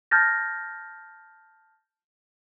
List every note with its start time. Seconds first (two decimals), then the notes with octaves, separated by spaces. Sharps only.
0.11 A5 F6 G6 A6 A#6